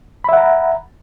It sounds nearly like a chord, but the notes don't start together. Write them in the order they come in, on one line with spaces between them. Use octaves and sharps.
B5 E5 F#5 A#5